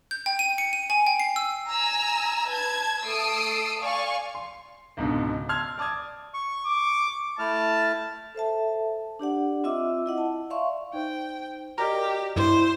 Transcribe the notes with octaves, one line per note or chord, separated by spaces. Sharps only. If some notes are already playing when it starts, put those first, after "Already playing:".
G6
G5
D#7
C#7
D#7
G#5
G5
C7
E6
G#5 A#5 E6
B4 A5 G#6
A3 A4 D#6 E6 C7 D7
D5 F5 G#5 C#6
C6
C#2 G#2 B2 D3
A5 C6 E6 F6 G#6
D5 A5 D6 D#6 G#6
C#6
D6
A3 E4 A5 F6
A4 C5 E5 A5
D4 G4 D5 F#5
C4 F4 D#5 E5 D6 E6
E4 D#5 F#5
A5
D5 E5 F5 C6 C#6
D#4 C5 G5
F#4 G4 A#4 D5 D#5
G2 E4 C5